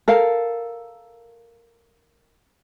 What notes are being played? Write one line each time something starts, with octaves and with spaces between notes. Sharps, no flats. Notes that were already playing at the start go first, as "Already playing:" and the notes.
A4 A#4 F5